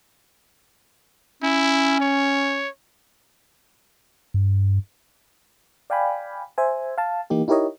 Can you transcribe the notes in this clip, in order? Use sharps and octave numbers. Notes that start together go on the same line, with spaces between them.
C#4 E4
C#5
G2
D5 F5 G5 G#5 B5
C5 E5 G#5
F5 A5
E3 A#3 D#4 G4
D#4 E4 G4 A#4 C#5 D#5